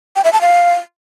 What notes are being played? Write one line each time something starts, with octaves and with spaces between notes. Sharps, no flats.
G5
E5
A5
F5